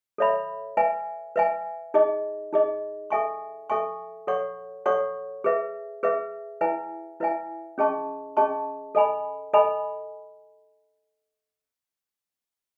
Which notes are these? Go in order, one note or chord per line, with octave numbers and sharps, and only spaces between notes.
A4 C#5 E5 B5
B4 E5 G#5
B4 E5 G#5
D#4 G#4 D#5
D#4 G#4 D#5
A4 E5 G#5 C#6
A4 E5 G#5 C#6
A4 C#5 F#5 C#6
A4 C#5 F#5 C#6
G#4 B4 E5
G#4 B4 E5
E4 B4 E5 G#5
E4 B4 E5 G#5
C#4 G#4 D#5 A5 C#6
C#4 G#4 D#5 A5 C#6
A4 D#5 G#5 B5
A4 D#5 G#5 B5